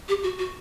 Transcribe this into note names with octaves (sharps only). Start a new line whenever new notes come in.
G4
F#4
F#4